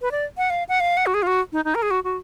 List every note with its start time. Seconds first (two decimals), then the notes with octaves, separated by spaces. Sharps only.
0.01 B4
0.12 D5
0.38 F#5
0.50 F5
0.69 F#5
0.80 F5
0.97 F#5
1.06 F#4
1.14 G#4
1.22 F4
1.27 F#4
1.52 D#4
1.65 D#4
1.75 A#4
1.82 G#4
1.91 F#4
2.04 F#4